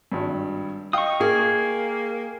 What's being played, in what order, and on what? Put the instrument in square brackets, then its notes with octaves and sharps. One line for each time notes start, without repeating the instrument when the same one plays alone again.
[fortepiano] G#1 G2
[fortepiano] D#5 F5 G5 [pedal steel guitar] C#6 D#6
[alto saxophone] A#3 [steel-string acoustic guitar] G#4